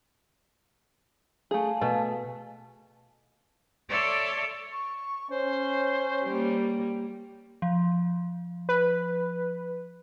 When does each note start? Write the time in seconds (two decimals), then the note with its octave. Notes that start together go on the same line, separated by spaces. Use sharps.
1.51 A3 G#4 F5 G#5 A5
1.81 B2 A3
3.89 A4 C#5 D5 E5 C6 D6
4.72 C#6
5.30 C#4 C5
6.25 G3 A#3
7.62 F3
8.69 B4